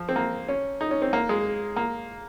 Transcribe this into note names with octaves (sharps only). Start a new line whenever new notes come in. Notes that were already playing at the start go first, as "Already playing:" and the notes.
Already playing: F3
C4
A#3
C#4
D#4
C#4
C4
A#3
G#3
A#3